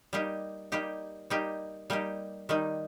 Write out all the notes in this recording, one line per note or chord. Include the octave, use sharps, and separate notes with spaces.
G3 A#3 D#4 G4
G3 A#3 D#4 G4
G3 A#3 D#4 G4
G3 A#3 D#4 G4
D#3 G3 A#3 D#4